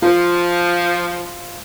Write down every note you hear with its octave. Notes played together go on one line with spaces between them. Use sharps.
F3 F4 C5